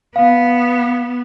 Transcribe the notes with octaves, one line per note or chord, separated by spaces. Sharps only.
B3 F5